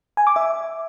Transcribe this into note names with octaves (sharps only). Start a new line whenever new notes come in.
G#5
D6
E5